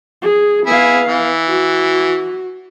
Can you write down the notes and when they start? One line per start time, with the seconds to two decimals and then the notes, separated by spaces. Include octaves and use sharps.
0.22 G#4
0.67 B3 E4 G#4 F5
1.07 E3
1.48 F#4